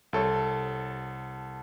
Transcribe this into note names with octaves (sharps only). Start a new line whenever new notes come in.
C2 A4 C#5